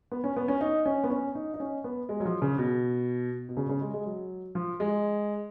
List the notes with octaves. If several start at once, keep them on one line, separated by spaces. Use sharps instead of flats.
B3
C#4
B3
C#4
D#4
C#4
B3
C#4
D#4
D#4
C#4
B3
G#3
F#3
F3
C#3
B2
B2
C#3
C#3
G#3
G#3
F#3
F3
G#3